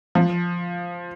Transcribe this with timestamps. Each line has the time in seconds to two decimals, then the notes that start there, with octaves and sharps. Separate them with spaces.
0.15 F3